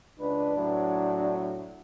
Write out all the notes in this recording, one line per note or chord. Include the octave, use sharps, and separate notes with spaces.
C#2 D4 B4
A2 F#3